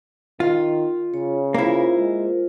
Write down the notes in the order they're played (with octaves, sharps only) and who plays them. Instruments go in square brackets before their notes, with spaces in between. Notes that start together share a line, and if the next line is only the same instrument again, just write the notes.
[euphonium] D#3 [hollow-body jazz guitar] F4
[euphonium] C#3 [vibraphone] C#5
[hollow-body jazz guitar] A#3 E4 [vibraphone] F4 A#4 C5
[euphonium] G#3